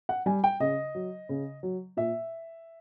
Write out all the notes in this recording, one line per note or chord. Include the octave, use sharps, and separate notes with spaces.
F#5
G3 G#5
G5
C#3 D#5
F#3
C#3
F#3
A#2 E5